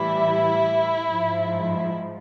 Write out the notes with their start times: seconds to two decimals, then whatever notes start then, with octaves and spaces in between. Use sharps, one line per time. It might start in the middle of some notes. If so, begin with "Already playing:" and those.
Already playing: A2 E3 G3 E4
1.08 G#2 F3